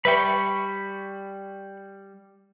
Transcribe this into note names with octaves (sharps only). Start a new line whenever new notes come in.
G3 B4 E5 G5 B5 C#6